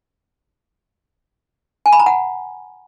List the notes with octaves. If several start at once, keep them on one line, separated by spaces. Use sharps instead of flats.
G#5
B5
A#5
F#5